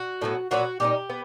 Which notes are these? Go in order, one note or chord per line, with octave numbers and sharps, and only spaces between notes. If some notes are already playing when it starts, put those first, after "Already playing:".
Already playing: F#4
A2 F#3 B3
A#2 F#3 B3 F#4
A#2 G3 B3 D#4 G4
B3